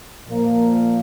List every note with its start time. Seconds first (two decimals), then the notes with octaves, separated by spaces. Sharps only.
0.29 A#2 F3 A#3